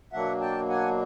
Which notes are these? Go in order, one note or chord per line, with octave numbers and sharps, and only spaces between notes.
B2 F#3 A#3 D4 E5 F#5
G5 A5
F#5 G#5